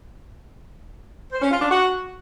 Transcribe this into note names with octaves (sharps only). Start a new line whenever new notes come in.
C5
C#4
F4
D4
F#4